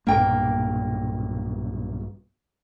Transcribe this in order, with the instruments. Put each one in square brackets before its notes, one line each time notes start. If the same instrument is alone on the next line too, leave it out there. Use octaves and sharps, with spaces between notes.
[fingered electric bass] B1 G2 A#2 [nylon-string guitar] A#3 G5